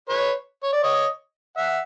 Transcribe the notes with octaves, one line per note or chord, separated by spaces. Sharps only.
B4 C#5
C#5
D5
C#5 D#5
E5 F#5